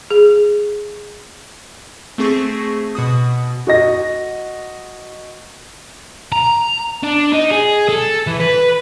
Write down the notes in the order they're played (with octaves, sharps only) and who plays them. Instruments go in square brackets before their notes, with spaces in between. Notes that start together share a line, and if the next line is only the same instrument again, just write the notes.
[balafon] G#4
[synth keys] A3 C4 G#4 C#6 A#6
B2 F#4 D#6
[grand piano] F#4 D#5 A#6
[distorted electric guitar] A#5
D4
D#4
G#4
A4
E3
B4